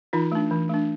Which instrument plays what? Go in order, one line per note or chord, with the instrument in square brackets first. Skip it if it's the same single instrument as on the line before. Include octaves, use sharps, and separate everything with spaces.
[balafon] E3 D#4 F4
A3 D4
E3
A3 D4